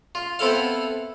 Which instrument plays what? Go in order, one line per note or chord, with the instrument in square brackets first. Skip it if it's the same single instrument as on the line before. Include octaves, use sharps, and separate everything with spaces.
[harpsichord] F4
B3 C4 E4 A4 F5